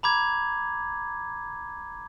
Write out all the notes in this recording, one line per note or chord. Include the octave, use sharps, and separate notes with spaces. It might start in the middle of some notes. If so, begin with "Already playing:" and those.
A#5 B5 D6 G#6